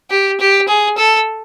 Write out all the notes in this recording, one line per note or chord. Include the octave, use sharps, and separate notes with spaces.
G4
G4
G#4
A4